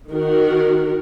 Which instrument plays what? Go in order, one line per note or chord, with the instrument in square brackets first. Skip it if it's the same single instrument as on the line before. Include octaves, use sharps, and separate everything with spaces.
[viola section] D#3 F#4 A#4